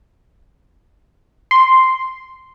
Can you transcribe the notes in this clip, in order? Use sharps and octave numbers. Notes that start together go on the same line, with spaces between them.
C6